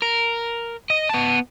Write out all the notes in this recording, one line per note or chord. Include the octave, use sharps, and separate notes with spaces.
A#4
D#5
B3 A5